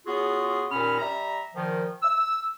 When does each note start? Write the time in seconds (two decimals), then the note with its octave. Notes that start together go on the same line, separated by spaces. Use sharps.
0.07 C#3 B3 F4 F#4 G#4
0.72 D#2 A#2 C#4 B5 F6
0.99 G3 E5 A#5
1.55 A#2 D#3 F3
2.03 E6